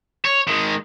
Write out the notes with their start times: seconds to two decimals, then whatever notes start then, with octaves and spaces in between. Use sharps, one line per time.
0.25 C#5
0.48 D#3 G#3